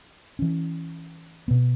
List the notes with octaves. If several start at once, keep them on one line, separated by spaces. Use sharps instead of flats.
E3 C#4
B2 B3